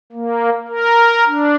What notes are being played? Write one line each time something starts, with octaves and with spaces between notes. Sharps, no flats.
A#3
A#4
D4